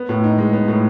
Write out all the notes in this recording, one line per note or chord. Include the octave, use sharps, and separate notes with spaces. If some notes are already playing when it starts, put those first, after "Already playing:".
Already playing: B3
A2
D#4
G#3
B3
A2